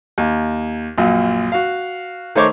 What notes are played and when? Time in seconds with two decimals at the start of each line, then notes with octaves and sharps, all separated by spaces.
0.18 D#2
0.98 A#1 F#2 A#2
1.52 F#4 F5
2.35 D#3 A3 D#4 C5 C#5 D6